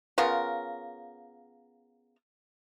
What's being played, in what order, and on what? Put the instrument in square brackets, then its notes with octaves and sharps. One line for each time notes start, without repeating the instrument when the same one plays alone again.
[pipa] C#3 B3 F4 A#4